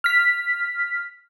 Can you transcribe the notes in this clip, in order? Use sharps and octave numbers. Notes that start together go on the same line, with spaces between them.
F6 B6